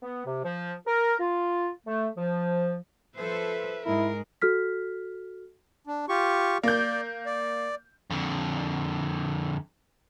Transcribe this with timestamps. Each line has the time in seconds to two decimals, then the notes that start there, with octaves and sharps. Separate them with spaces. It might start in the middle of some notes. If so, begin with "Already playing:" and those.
0.02 B3
0.25 C3
0.43 F3
0.87 A#4
1.19 F4
1.86 A3
2.17 F3
3.17 F3 A4 B4 C5 E5
3.85 G#2 G#3 E4 A#4
4.42 F#4 A4 F6 B6
5.87 D4
6.09 F4 G4 C#6
6.63 A#3 D5 G6
7.26 D5
8.10 F2 D3